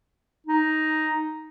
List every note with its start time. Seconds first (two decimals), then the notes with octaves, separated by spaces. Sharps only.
0.47 D#4